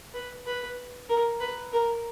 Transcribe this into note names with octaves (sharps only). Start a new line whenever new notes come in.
B4
B4
A#4
B4
A#4